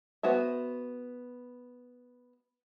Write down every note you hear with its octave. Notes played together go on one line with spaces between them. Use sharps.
B3 F#4 C5 E5